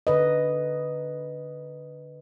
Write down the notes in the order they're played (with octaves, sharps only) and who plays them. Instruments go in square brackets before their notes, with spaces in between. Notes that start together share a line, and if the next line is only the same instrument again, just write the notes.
[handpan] D3 B4 D#5